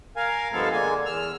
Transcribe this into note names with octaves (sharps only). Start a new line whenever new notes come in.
A#4 F5 G#5
G2 F3 G#3 B3 A4 F5
D3 G#3 A#3 G#5
E2 E6 F6